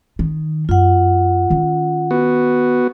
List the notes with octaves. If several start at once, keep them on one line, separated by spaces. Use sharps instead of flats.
D#3
F#2 F4 F#5
D#3 C#4
B3 F#4